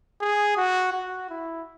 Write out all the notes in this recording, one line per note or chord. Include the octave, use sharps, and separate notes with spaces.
G#4
F#4
F#4
E4